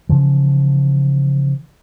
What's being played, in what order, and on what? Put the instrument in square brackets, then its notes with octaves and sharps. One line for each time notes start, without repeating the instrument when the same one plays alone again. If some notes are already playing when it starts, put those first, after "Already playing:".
[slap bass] C#3 E3 F3